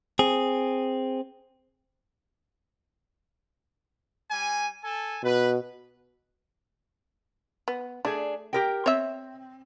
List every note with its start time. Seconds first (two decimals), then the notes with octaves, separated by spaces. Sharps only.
0.19 C4 G#4
4.31 G3 G#5
4.83 A4 G#5 A5
5.23 B2 B4
7.68 B3
8.05 A3 D4 G#4
8.53 G4 A#4 G5
8.86 C4 C#5 E5